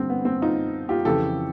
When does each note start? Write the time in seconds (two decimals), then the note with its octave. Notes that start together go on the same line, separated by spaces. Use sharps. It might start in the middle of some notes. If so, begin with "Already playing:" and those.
Already playing: G2 D3 C4
0.10 B3
0.25 C4
0.42 D#4 F4
0.89 F4 G4
1.05 F2 C#3 E3 G4 A4